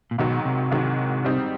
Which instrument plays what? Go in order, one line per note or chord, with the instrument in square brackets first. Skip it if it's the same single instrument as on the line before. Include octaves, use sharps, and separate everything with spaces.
[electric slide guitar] A#2
[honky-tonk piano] G#2 D#3 F#3 [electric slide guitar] B2
[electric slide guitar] C3
[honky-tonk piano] G#2 D#3 F#3
G3 C4 D#4